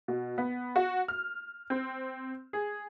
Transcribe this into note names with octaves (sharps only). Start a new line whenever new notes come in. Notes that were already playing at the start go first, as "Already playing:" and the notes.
B2
B3
F#4
F6
C4
G#4